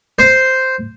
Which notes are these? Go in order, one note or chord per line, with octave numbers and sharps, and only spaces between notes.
C5